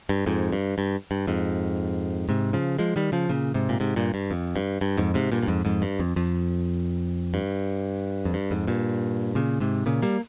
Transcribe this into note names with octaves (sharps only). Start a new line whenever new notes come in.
G2
F2 G#2
G2
G2
G2
F2 G#2
G#2 C3
C#3 F3
F3 G#3
D#3 G3
C#3 F3
A#2 C#3
G#2 C3
A#2
G#2 C3
G2 A#2
G2
F2
G2
G2
F2 G#2
G#2 C3
G2 A#2
G2
F2 G#2
F2 G#2
G2
F2
F2
G2
F2
G2
F2 G#2
G2 A#2
A#2 C#3
G#2 C3
A#2 C#3
G3 A#3